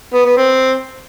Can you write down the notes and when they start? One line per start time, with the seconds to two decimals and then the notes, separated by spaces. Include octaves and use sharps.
0.14 B3
0.26 B3
0.37 C4